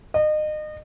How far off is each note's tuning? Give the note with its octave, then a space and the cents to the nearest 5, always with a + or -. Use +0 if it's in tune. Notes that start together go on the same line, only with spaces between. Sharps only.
D#5 -30